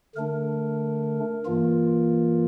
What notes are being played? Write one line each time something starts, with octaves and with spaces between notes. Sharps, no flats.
D3 A3 D4 A#4
G2 E3 A#3 F4